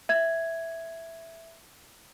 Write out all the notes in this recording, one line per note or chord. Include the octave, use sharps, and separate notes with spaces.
E5 G#6